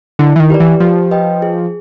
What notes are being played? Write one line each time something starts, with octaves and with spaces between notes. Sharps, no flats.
D3 E4
E3
D#3
G4 B4 D5
E3
F3 G4
B4 D#5 G5
G#4